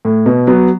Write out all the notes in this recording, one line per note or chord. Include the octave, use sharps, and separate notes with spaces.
A2
B2
F#3 B3